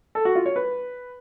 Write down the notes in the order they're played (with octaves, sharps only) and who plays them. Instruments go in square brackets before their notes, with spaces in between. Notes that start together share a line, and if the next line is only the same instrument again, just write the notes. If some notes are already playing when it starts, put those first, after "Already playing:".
[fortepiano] A4
F#4
F4
C#5
B4